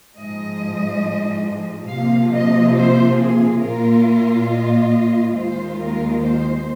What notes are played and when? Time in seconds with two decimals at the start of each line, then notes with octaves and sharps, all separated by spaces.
0.17 G#2 F3 G#3 D#5
1.89 C3 F3 A#3 F4 F5
2.33 D#5
2.76 C5
3.19 G#4
3.62 A#2 A#3 F4 A#4
4.49 D#5
5.35 D#2 D#3 G#3 F4 C5
5.78 A#4
6.21 C5